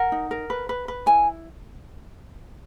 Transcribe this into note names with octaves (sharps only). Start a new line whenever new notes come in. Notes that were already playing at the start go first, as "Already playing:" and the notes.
Already playing: A#4 F#5
D#4
A#4
B4
B4
B4
E4 G#5